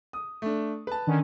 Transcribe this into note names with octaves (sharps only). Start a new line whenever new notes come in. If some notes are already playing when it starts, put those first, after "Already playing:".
D#6
A3 D4
B4 A5
D3 D#3 C#4